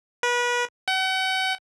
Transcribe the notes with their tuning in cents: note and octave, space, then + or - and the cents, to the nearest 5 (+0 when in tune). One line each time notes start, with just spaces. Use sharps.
B4 -30
F#5 +40